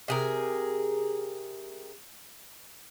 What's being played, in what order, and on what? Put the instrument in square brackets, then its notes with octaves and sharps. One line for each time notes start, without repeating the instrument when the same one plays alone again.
[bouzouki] C3 G#4 A#4